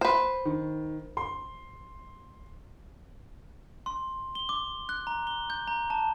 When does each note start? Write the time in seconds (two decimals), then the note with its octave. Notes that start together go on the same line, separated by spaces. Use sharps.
0.01 B4 C5
0.45 D#3
1.17 C6
3.86 C6
4.35 G7
4.49 D6
4.89 F#6
5.07 A#5
5.27 G7
5.50 G6
5.68 A#5
5.90 A5